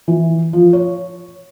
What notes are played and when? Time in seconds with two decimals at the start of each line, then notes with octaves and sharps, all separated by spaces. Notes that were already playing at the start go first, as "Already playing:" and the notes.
0.08 E3
0.53 F3
0.73 C#5